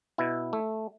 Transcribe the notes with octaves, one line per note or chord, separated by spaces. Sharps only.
B2 E4
A3